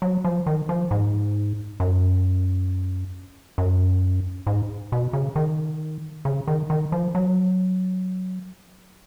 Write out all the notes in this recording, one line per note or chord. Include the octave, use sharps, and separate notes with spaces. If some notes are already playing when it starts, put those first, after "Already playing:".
F#3
F3
D#3
F3
G#2
F#2
F#2
G#2
B2
C#3
D#3
C#3
D#3
D#3
F3
F#3